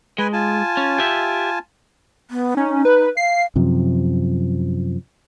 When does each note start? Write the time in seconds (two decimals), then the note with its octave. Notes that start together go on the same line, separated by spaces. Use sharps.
0.18 G#3 B4 G#5
0.33 F4 G#5 A5
0.77 C#4
0.98 G4 E5
2.31 B3
2.57 C#4 D#4
2.85 B4
3.17 F5 C7
3.56 F#2 C3 F3